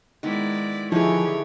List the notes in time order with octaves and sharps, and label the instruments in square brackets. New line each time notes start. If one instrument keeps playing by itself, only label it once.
[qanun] D#3 B3 [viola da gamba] G#3 E4 D5
[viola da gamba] D3 G4 C#5 [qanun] D#3 B4 [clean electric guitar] F3 [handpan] E4 G#4